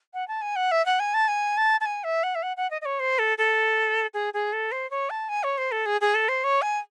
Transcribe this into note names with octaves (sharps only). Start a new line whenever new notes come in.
F#5
A5
G#5
F#5
E5
F#5
G#5
A5
G#5
A5
A5
G#5
E5
F#5
E5
F#5
F#5
D#5
D#5
C#5
C5
A4
A4
G#4
G#4
A4
C5
C#5
A5
G#5
C#5
C5
A4
G#4
G#4
A4
C5
C#5
G#5